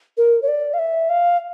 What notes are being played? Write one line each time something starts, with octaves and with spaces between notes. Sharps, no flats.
A#4
C#5
D5
F5
E5
F5